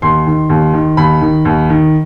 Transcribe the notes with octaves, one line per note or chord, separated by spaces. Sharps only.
D#2 C6
D#3
D#2
D#3
D#2 B5
D#3
D#2
D#3